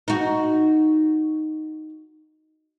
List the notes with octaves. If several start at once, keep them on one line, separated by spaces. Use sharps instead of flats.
D#4 F#4